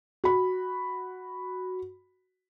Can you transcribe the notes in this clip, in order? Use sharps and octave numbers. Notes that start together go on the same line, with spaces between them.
F#4 B5